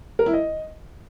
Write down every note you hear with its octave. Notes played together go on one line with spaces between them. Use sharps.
A#4
E4
D#5